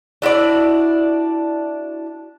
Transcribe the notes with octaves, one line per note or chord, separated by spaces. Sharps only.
D4 E4 F#4 D5